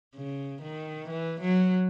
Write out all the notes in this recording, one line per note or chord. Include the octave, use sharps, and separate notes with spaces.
C#3
D#3
E3
F#3